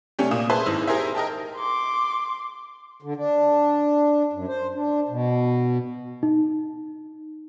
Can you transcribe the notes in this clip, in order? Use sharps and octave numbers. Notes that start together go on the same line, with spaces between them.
C3 A3 C#4 D4 G4
A#2 A#3 D#6 E7
G#4 B4 C5 E5 A5 C6
G#1 G#3 D#4 E4 E6
D#4 G4 G#4 A#4 C5 E5
A#4 D#5 G5 A5
C6 D6
D3
D4
F#2
C5
D4
B2
D#4